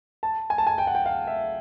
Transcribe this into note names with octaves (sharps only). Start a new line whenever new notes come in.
A5
G#5
A5
G#5
G5
F#5
G5
F5
E5